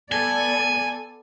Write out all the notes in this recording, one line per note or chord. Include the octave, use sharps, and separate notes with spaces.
B3 A4 D5 G#5